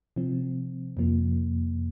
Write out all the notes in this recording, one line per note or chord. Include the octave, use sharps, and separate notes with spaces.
C3 F3 C4
F2 C3 F3 A#3